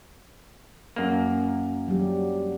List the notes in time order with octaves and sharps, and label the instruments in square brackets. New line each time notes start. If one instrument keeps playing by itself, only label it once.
[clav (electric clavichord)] F#2 A#3
[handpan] F#3 G3 G4